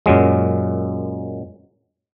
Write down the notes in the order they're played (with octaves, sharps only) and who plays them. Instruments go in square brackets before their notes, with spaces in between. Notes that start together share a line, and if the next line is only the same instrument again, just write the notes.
[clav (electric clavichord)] F#2 A#2 F#3 G#3